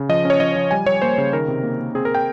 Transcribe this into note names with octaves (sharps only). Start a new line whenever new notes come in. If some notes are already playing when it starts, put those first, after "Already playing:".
Already playing: C#3
F3 D#5
C#4 C#5
F3 D#5
F3
G3 G#5
G3 C#5
A#3 C5
C#3
D#3 A#4
C3
A#3
A#3
C4 G#4
A#4
C4
G5